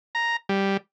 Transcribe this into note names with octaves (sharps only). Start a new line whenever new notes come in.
A#5
G3